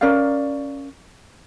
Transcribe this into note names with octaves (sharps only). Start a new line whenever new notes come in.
C#4 A#4 D5 F5